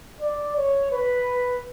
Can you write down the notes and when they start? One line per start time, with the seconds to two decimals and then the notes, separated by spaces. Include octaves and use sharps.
0.21 D5
0.56 C#5
0.91 B4